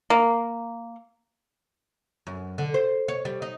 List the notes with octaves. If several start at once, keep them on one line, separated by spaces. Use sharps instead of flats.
A#3
F#2
D3
C5
C#5
G3
D#4